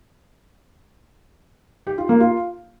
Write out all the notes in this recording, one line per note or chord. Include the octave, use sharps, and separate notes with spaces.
G4
F4
A#3
F4